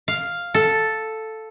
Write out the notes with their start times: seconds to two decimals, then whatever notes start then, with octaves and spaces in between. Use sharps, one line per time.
0.08 F5
0.54 A4